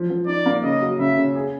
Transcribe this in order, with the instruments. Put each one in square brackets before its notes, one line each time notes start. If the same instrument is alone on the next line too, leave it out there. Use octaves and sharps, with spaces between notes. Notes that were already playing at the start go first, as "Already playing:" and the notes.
Already playing: [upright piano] F3
F3
[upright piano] D#4 [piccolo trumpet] D5
[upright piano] A#3
[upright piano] C#3 [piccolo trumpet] D#5
[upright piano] F#3
[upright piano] C#3 [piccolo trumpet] E5
[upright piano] C#3
G#4